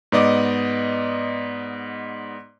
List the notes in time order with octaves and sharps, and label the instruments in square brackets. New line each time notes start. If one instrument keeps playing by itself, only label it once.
[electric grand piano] G#2 B3 D5 D#5 D6